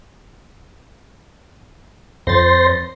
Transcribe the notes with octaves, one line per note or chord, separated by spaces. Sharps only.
F2 C5 C6 A6 A#6